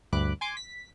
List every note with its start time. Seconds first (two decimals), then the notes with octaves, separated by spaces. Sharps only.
0.13 D2 G2 B5 D6 F#6
0.41 G#5 C6 D6
0.57 B6